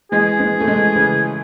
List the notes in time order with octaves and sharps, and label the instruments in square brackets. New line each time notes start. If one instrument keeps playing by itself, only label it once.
[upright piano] E3 G#3 [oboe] G#4
[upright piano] E3 G#3
A3
E3 G#3
C#3 E3